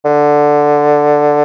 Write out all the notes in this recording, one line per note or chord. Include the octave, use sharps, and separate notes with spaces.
D3